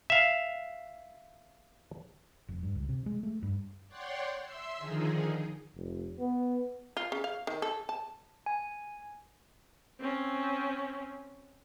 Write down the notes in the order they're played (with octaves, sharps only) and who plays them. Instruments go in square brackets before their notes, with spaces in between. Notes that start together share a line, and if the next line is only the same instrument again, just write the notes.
[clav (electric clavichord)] E5 F5
[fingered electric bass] F1
G2
C#2
C3
G#3
A3
G2
[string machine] C#5 D5 F#5 G5 C6
E5 C6 E6
D3 D#3 F3 D#4 G#4
[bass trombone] F1
B3
[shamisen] F4
C#3
F5
D#3
A4
A5
[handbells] G#5
[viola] C4 C#4